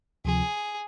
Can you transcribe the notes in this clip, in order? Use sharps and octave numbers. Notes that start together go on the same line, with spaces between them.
D2 C3 F3 G#4